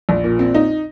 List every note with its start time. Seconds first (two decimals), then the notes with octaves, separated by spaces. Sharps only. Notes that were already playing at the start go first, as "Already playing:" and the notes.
0.09 A#1
0.24 A#2
0.39 C4
0.54 D#4